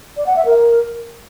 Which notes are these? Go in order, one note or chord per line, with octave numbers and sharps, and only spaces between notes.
D5
F#5
E5
A#4